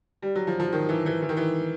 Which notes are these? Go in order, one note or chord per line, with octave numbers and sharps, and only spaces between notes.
G3
F#3
F3
F3
D#3
E3
E3
E3
D#3
E3